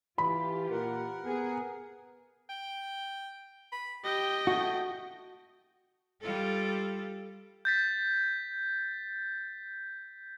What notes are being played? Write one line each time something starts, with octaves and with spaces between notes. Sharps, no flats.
E3 F4 G4 B5
A#2 A#4 F#5
B3 G#4
G5
B5
G4 D#5 G5
A3 F#4
G3 F4 A4
G6 A6 B6